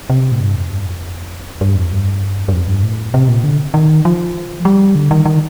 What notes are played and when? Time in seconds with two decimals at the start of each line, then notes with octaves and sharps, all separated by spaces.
0.10 C3
0.32 A2
0.41 G2
0.55 F2
0.70 G2
0.86 F2
1.61 G2
1.76 F2
1.92 G2
2.48 G2
2.53 F2
2.67 G2
2.83 A2
3.14 C3
3.29 A#2
3.44 D3
3.74 D#3
4.05 F3
4.65 G3
4.95 D3
5.11 D#3
5.25 D#3